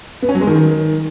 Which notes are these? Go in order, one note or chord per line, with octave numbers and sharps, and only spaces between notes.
B3
C#4
F#3
G#3
D#3